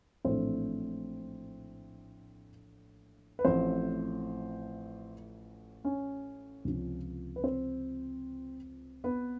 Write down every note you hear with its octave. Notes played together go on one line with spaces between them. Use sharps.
A#1 A2 E3 A3 C4 C5
B4
A1 A2 F3 A3 C4 C5
C#4 C#5
C#2 C3 F3
B4
C4 C5
B3 B4